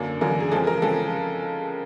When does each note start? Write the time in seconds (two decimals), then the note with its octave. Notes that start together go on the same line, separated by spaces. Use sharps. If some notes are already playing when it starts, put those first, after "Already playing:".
Already playing: F#2 D3 F#3 A#3
0.21 F#2 D3 F#3 A#3 A#4
0.40 G#4
0.52 C#3 F3 G#3 C4 A4
0.67 A#4
0.82 C#3 F3 G#3 C4 A4